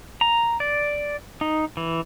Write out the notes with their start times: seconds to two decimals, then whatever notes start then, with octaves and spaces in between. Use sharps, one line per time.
0.21 A#5
0.60 D5
1.41 D#4
1.77 E3